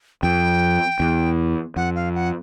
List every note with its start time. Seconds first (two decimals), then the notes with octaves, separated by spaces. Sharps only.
0.22 F2 G5
1.00 E2
1.76 F2 F#5
1.96 F5
2.15 F#5